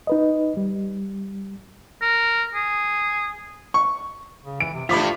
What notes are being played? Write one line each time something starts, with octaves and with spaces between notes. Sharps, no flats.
D#4 B4 D#5
G3
A#4
G#4
C#6
C#3
E3 D7
C3
G2 F3 A3 F4 B5 D6 B6